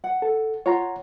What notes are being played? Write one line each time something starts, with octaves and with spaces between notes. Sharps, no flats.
F#5
A4
F4 C#5 F#5 A#5